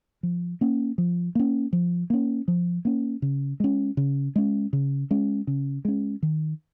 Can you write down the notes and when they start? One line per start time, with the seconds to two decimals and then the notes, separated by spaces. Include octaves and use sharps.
0.23 F3
0.61 A#3 C#4
0.98 F3
1.35 A#3 C#4
1.73 F3
2.10 A#3 C#4
2.48 F3
2.85 A#3 C#4
3.22 C#3
3.60 G#3 C#4
3.97 C#3
4.36 G#3 C#4
4.73 C#3
5.11 G#3 C#4
5.47 C#3
5.85 G#3 C#4
6.23 D#3